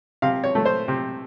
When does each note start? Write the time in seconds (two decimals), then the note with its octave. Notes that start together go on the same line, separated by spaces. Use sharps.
0.22 C3 F5
0.44 C#5
0.55 A3
0.65 C5
0.88 C3